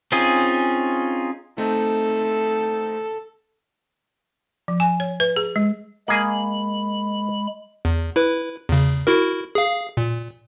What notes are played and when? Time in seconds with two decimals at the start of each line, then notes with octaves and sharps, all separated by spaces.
0.12 C4 C#4 D#4 F4 G#4
1.58 A3 C4 D#4 A4
4.68 F3
4.80 G#5
5.00 C#5
5.20 B4
5.36 G#4
5.56 G#3
6.08 G#3 A#3 G#4 B5
7.85 E2
8.16 E4 B4
8.69 E2 C#3
9.07 E4 F#4 A#4
9.55 G#4 F5
9.97 A#2